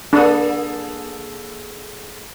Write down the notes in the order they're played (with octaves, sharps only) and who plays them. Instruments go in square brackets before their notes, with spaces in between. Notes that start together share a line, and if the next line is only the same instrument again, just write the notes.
[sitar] A#3 G#4 A4 [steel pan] D4